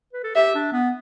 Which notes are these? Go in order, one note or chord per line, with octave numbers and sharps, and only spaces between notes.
B4
A4
G4 E5
D4
B3